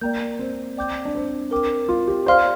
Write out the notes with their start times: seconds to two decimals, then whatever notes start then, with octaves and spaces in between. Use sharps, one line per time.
0.01 A#3 D5 G5 A#5 G6
0.39 C4
0.77 D5 G5 D6 G6
1.05 D4
1.15 C4
1.51 A#4 G5 D6
1.89 F4
2.07 G4
2.26 G4 C5 D5 F5 C6 F6